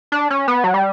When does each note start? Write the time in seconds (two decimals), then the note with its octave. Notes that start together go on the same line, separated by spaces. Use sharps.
0.12 D4
0.30 C#4
0.48 B3
0.64 F#3
0.74 G3